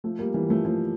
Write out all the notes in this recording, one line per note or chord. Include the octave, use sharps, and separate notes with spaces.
F3 A3
G3 A#3
E3 G3
F3 A3
F3 A3